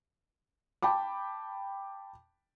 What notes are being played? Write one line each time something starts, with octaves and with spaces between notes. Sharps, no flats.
G5 A5 B5 D6